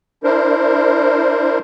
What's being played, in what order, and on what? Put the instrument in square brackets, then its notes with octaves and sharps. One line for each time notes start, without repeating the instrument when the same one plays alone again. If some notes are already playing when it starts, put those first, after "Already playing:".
[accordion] D4 E4 A#4 C5